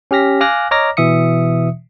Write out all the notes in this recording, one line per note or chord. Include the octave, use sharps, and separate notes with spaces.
C#4 G4 F6 A#6 B6
F5 G#5 D6 F6 F#6 A#6
C#5 D#5 A#5 D6 F6 A#6
B2 E3 E5 D#6 C#7